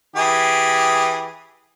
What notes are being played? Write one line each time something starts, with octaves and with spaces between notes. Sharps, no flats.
E3 G4 G#4